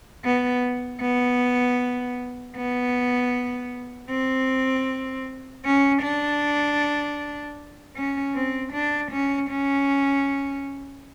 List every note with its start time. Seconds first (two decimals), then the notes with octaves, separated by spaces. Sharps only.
0.25 B3
1.01 B3
2.56 B3
4.10 C4
5.65 C#4
6.02 D4
7.96 C#4
8.35 C4
8.73 D4
9.12 C#4
9.50 C#4